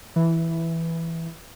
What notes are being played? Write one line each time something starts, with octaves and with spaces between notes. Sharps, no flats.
E3